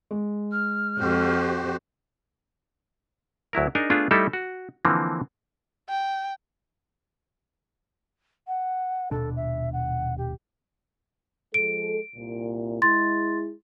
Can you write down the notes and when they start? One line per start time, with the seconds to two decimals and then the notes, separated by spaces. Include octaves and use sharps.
0.11 G#3
0.52 F6
1.00 F2 F#4 G4 C5
3.53 D2 F#3 E4 A#4
3.75 D4 D#4 G#4 A#4 D#5 G#5
3.90 A3 B3 D4 F4 G#4
4.11 G3 A3 D#4 E4 A4
4.33 F#4
4.85 D3 E3 F3 A#3 C4
5.89 G5
8.47 F#5
9.11 D#1 B2 D4 A4
9.36 E5
9.73 F#5
10.18 G4
11.54 F3 G#3 A4 D7
12.15 C2 A#2
12.82 G#3 E4 C6 A6